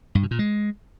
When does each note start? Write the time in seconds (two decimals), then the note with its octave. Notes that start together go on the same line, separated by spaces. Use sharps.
0.15 G2
0.23 B2
0.31 A#2
0.39 G#3